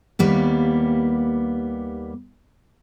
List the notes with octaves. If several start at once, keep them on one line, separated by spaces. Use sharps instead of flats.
D#2 G3 A#3 B3